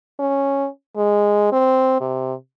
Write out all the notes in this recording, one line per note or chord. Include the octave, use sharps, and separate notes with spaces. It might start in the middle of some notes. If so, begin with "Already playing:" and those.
C#4
G#3
C4
C3